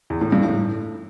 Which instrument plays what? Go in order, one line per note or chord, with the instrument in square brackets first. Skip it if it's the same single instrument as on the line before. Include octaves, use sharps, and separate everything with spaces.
[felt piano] E2
A2
G2
A2